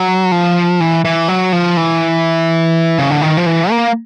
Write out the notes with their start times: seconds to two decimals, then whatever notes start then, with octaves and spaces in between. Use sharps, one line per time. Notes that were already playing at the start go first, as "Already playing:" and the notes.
Already playing: F#3
0.32 F3
0.80 E3
1.05 E3
1.28 F#3
1.53 F3
1.77 E3
2.99 C#3
3.10 D3
3.21 D#3
3.37 F3
3.46 E3
3.70 A#3